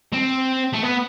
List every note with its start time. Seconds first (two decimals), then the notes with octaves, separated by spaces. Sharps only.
0.13 C4
0.74 A3
0.84 B3